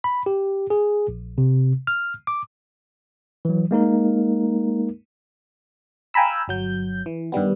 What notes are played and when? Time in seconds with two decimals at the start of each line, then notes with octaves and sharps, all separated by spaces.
0.04 B5
0.26 G4
0.70 G#4
1.08 A#1
1.38 C3
1.87 F6
2.27 D6
3.45 E3 F#3
3.71 G#3 A#3 D#4 A#4
6.14 F5 G5 G#5 A#5 B5 E6
6.48 G1 F#3 G6
7.06 E3
7.32 G2 D#3 G3 B3